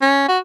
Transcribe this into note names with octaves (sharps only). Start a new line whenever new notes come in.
C#4
F#4